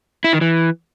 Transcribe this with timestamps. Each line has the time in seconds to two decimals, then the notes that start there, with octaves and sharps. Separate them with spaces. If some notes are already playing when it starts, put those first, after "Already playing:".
0.24 E4
0.33 D#3
0.41 E3